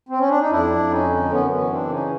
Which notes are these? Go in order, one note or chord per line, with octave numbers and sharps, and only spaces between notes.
C4
C#4
D4
D#4
F2 D4 E4
F2
C#4 D#4
D3
F#2 B3 C#4
B3 C#4
E3
C4 D4
C#3
C#4 D#4